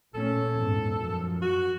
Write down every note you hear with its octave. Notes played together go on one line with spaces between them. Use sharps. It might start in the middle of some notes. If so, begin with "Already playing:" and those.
A#2 A3 C#4 A4
E2 G#2
F#2 F3
F#4